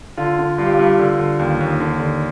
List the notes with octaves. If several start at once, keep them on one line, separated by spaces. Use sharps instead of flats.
D3 F4
D3
G2 F4
G4
F4
G2
D3
D3
D#2
D#2
D3
D3